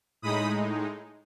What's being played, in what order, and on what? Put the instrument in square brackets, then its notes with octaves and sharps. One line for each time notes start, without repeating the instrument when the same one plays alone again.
[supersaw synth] A2 G#3 D#4 B5 D#6